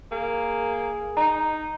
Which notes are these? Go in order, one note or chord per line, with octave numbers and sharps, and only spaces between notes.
A#3 G#4
D#4 A#5